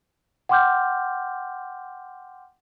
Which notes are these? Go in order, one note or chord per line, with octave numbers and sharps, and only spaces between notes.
F#5 G5 C6 D6 F6 G6